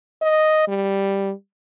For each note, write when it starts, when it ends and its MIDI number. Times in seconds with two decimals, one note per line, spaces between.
0.22 0.65 75
0.68 1.32 55